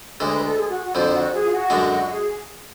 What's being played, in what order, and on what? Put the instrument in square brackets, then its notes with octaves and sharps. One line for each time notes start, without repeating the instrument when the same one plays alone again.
[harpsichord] D2 D3 G#3 [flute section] C#5
[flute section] B4
A4
G#4
F#4
F#4
[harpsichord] F2 D3 F3 [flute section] F4
[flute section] F4
F#4
G#4
F4
F#4
[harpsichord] F#2 D3 G#3 D4
[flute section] G#4